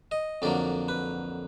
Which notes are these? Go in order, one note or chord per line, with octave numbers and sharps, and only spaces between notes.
D#5
F2 D3 F#3 A#3 D5
B4